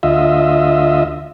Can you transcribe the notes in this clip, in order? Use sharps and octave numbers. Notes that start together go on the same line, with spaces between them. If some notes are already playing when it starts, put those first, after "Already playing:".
D2 F4 D#5 E5